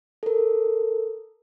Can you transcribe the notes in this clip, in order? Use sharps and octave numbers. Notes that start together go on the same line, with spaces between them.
A4 A#4